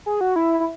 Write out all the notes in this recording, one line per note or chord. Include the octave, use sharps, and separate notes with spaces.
G#4
F#4
E4
E4